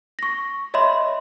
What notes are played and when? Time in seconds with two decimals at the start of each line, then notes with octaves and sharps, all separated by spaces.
0.19 C#6 A#6
0.74 C#5 D#5 E5 B5 C6